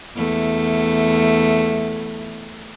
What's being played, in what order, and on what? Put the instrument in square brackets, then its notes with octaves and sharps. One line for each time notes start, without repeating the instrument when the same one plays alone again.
[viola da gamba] E2 A3